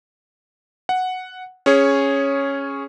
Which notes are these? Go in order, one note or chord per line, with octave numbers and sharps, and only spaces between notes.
F#5
C#4 G#4 C#5